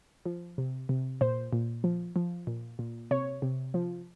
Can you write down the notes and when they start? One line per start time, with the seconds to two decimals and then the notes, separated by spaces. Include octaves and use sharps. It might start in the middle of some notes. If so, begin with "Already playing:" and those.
0.26 F3
0.58 C3
0.89 C3
1.21 A#2 C5
1.53 A#2
1.84 F3
2.16 F3
2.47 A#2
2.79 A#2
3.11 C3 C#5
3.42 C3
3.74 F3